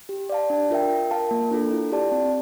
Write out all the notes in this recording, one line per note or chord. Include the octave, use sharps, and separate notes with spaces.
G4
D5 F5 A5
D4
F4 A#4 E5 G5
F4
A#4 F5 A5
A#3
D4 F4 A4
E4
G4 D5 A5
C4